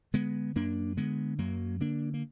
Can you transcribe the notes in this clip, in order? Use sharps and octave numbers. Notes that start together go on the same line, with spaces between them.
D3 G#3 B3
F#2 A#3 D4
D3 G#3 B3
F#2 F#3 A#3
D3 A#3 D4
A#3